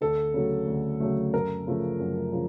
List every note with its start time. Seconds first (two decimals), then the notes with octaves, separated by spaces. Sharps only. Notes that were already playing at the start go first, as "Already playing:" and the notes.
0.01 D2 A4
0.34 C#3 F#3 A3
0.67 D2
1.00 C#3 F#3 A3
1.33 F#2 A#4
1.67 C#3 F3 A3
2.00 F#2
2.32 C#3 F3